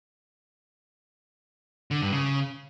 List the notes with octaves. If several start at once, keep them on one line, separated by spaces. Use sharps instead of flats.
D3
G2
C#3